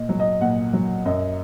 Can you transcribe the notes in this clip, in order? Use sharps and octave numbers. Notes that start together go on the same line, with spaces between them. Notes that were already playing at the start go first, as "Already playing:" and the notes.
Already playing: A#2 D#5
F#3
D#5
A#2 F#5
F#3
F#2 D#5